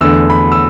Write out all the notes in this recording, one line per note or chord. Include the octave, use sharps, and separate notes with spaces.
E2 D3 A3 E6
B5
E6